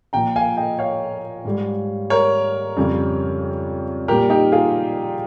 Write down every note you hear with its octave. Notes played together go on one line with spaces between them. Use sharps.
A#2 F3 G5 A#5
F5 G#5
D#5 G5
C#5 F5
G#2 G3
A#4 C#5
F2 C#3 G3
A#2 G3 G4 A#4
D#4 G4
F4 G#4